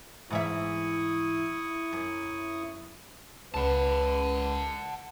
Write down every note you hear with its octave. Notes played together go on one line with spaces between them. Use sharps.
G#2 E3 E4 E5 C#6 D#6
F#2
C#2 B4 F#5 A5